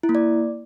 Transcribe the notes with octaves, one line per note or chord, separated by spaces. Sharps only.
E4
A#3
D5